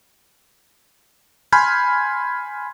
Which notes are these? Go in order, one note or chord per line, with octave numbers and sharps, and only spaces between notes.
G#5 B5 C6 F6 G6 G#6